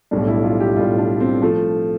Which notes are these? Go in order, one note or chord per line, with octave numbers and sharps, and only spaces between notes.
B1 A2 G3 D4
E4
F4
G4
B1 A2 G3 F4
D4
C4
F3 A3